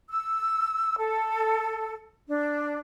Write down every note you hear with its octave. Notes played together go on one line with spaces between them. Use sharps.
E6
A4
D4